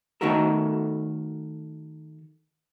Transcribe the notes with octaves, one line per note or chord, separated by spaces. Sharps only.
D#3 A3 D#4 F#4 A4 A#4